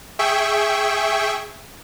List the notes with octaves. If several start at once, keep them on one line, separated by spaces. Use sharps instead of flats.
G#4 E5 G5 C#6